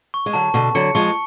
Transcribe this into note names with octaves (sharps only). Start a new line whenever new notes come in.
C#6
G#3
D3 F#3 A5
B2 D3 C#6
D3 F#3 C#7
F3 G#3 C#6